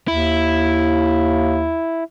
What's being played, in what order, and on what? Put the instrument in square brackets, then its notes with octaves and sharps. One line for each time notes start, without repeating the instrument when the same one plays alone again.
[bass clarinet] D#2 [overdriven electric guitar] E4